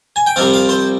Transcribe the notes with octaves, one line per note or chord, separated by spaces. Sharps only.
G#5
G5
C2 C3 F3 C4 F5
F5
C5